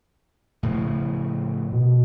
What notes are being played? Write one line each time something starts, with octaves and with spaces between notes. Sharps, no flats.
A2 C#3 F3
B2